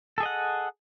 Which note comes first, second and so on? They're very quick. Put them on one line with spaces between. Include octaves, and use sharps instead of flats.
A4 G#4 D#5 F#5